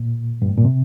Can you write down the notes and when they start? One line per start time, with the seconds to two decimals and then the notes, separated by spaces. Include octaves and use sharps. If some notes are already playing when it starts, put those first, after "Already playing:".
Already playing: A#2
0.42 G2
0.49 A2
0.58 A#2
0.65 C3